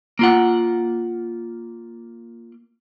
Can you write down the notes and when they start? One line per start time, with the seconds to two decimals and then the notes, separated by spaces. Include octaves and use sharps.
0.19 A#3 F4 F#5